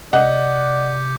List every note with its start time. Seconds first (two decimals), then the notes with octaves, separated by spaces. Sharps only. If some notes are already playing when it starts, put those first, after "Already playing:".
0.13 C3 D5 D#5 F#5 D6 G6